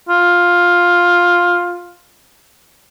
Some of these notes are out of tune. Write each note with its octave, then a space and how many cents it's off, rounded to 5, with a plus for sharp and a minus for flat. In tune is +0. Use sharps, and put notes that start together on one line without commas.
F4 +10